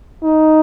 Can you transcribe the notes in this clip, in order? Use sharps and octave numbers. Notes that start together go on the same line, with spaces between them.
D#4